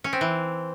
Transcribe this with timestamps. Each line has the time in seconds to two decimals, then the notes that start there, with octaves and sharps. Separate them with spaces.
0.04 C#4
0.13 C4
0.21 E3